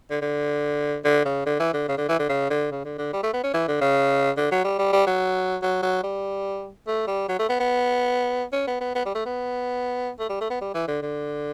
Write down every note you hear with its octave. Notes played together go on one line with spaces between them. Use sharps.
D3
D3
D3
C#3
D3
E3
D3
C#3
D3
E3
D3
C#3
D3
C#3
D3
D3
G3
A3
B3
C#4
E3
D3
C#3
D3
F#3
G3
G3
G3
F#3
F#3
F#3
G3
A3
G3
F#3
A3
B3
B3
C#4
B3
B3
B3
G3
A3
B3
A3
G3
A3
B3
G3
E3
D3
D3